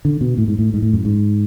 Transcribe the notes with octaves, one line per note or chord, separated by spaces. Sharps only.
D3
B2
A2
G#2
A2
G#2
A2
F#2
G#2